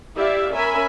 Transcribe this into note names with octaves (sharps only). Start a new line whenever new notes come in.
E4 G4 D5 E5 F5
C#4 A#4 E5 G#5 B5